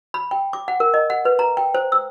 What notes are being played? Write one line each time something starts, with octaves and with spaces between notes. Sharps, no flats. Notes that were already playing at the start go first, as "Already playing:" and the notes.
B5
G5
D6
F#5
A#4
D#5
F#5
B4
A#5
G5
C5
E6